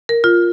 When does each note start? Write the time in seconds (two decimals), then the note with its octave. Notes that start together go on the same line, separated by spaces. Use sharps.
0.09 A#4
0.24 F4